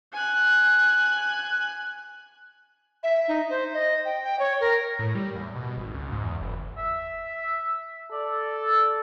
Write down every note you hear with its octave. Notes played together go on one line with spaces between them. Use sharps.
G#5 F#6
E5
D#4
C5
D#5
G5
G5
C#5
A#4
A2
G3
E2
B2
G#1
C#2
G#2
E2
F#1
E5
A4 D5